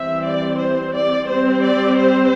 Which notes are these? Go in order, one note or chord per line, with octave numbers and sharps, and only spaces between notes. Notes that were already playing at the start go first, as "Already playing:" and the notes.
Already playing: E3 G3 C4 E5
D5
C5
D5
G3 C4 C5
D5
C5